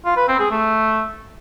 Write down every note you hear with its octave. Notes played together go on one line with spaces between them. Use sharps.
F4
B4
C4
G#4
A3